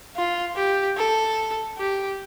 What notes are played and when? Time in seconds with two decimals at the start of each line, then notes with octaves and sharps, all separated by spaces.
0.16 F4
0.56 G4
0.97 A4
1.78 G4